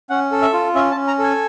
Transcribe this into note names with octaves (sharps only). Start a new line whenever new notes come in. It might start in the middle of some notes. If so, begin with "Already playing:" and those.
C#4 F#5
A4
E5
F4
C#4 E5
A5
C#4
A#5
A4 G#5